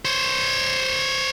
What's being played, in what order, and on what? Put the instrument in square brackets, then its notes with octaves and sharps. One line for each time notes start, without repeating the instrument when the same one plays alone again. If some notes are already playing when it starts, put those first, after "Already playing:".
[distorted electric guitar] C5 C#5